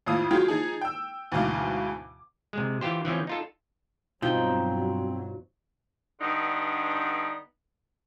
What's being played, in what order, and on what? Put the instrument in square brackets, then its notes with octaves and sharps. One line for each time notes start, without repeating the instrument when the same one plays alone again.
[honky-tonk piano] G#1 F2 A2 F3 F5 D#6
F#3 F4 G4 G#4
F3 D#4 G#4
G5 E6
D2 G#2 B2 E3 F5 D6
[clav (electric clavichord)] C3 G#3
E3 F4 G4 C5
E3 F3 C4 C#4
D#4 F4 A4
[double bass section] G2 F#3 [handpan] B2 D#4 [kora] F3 [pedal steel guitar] C4 G5
[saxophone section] G2 D3 B3 D#4